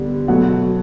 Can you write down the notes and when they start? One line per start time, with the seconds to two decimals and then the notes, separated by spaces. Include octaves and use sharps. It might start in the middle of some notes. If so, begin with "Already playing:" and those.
Already playing: D3 G3 B3
0.28 B2 F#3 A3 F#5